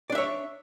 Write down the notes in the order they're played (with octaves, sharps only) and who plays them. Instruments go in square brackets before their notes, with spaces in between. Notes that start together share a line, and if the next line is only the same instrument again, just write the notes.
[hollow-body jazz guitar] D5
D4
E5
C#5